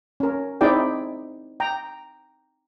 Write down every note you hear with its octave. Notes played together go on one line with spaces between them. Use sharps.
C#4 A#4
C4 D#4 E4 G#4 D5 G5
G5 A#5